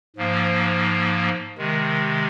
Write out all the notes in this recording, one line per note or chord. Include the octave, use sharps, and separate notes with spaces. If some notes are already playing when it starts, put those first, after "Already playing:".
G#2 F3 A#3
C3 D#3 G#3